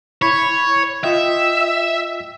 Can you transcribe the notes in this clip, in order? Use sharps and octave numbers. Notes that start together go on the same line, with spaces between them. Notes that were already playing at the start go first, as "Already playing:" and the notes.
E4 C#5 B5 C#6
F4 D#5 E5 G5